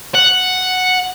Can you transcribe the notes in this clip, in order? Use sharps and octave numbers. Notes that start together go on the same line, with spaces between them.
F#5